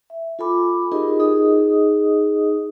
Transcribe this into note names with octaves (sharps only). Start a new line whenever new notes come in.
E5
F4 A4 G#5 B5 D6
D#4 F4 G4 G#4 A#4 D#5
D#4 G#4 D#5 D#6